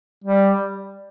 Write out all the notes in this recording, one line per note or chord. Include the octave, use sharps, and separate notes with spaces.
G3